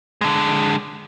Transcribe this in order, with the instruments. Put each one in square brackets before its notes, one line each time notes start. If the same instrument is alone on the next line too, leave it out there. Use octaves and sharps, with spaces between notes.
[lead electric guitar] D3 G#3